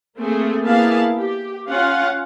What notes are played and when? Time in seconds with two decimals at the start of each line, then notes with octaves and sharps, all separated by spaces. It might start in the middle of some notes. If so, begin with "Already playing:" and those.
0.17 A3 A#3 C4 G#4 A4
0.65 A#3 B3 E4 G#4 F5 A5
1.16 G4
1.68 C#4 F4 F5 F#5